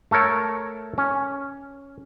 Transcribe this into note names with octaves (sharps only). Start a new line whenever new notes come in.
A3 A4 A#4 C#5
C#4